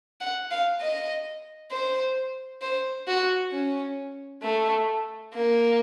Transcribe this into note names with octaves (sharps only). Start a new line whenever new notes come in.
F#5
F5
D#5
C5
C5
F#4
C#4
A3
A#3